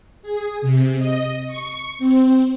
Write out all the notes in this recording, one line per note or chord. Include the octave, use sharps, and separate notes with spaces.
G#4
C3
D#5
C#6
C4